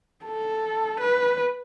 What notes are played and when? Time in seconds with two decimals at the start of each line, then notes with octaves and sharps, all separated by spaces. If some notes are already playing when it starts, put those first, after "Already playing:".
0.25 A4
1.00 B4